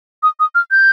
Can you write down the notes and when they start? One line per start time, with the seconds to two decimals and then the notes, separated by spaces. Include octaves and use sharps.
0.23 D#6
0.40 D#6
0.55 F6
0.71 G6